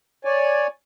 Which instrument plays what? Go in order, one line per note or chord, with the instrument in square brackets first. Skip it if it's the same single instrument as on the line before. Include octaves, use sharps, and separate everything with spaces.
[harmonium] C#5 D5 G#5